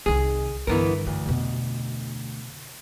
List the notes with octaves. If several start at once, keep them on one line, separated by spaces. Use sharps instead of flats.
C2 D#3 G#4
G2 D3 E3 B3 A#4
D2 E3
F2 B2